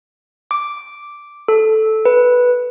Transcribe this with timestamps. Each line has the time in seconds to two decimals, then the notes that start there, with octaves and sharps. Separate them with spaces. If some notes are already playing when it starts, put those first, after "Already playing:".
0.51 D6
1.48 A4
2.05 B4